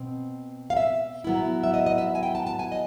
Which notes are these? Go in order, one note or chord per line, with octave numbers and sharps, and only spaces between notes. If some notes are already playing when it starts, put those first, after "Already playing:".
Already playing: B2 C4
F5
E5
F#3 B3 E4
E5
D#5
D#5
E5
G#5
G5
A5
A5
G#5
D#5